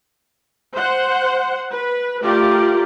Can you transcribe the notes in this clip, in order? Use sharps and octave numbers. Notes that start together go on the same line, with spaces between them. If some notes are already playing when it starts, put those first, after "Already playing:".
C5 F#5
B4
A3 F4 G4 A#4 D5